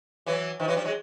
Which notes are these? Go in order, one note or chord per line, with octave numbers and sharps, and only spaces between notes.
E3 F#3
D#3 F3
E3 F#3
F3 G3
F#3 G#3